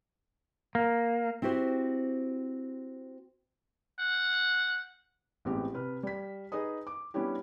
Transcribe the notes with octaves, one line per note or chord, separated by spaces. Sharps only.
A#3
C4 E4 F#4 G4 C5
F#5
A1 G#3 B3 C4 G4
C3 B4 F6
G3 B6
D#4 G#4 B4 D#5 D#6
D6
G3 B3 C#4 D4 E4 G4